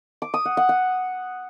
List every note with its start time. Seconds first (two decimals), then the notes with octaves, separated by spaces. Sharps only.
0.22 D6
0.34 D#6
0.45 F#5
0.57 F#5
0.69 F#5